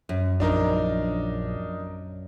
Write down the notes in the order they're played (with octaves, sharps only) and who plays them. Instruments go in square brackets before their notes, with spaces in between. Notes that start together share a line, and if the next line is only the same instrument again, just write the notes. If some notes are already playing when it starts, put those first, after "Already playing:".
[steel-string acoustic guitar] F#2
[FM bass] A#1 [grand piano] D4 D#4 A#4